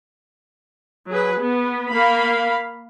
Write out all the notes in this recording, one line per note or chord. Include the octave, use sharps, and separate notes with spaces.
F#3 G#4 B4
B3
A#3 F5 B5